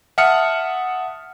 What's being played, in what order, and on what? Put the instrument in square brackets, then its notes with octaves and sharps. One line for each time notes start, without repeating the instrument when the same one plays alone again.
[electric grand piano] E5 F#5 A5 D#6 F6 C#7